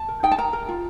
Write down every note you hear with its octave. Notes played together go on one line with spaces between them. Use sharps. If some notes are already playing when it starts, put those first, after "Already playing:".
Already playing: A5
A#4
D#4 G5
A5
A#4 A#5
A#4
F4